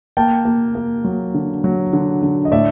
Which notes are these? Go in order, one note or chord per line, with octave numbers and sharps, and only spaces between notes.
A#3 G5 A5
A#3
A#3
F#3
D3
F#3
D3
D3
D#5
A2 D5 E5